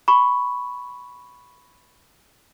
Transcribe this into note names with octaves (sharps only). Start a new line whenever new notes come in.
B5 C#6